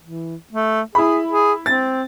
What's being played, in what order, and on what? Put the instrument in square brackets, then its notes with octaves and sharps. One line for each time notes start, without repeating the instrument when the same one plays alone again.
[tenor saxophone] E3
A3
[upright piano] E4 B5 [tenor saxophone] G#4
[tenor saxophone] G#4
[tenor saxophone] C4 [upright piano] A6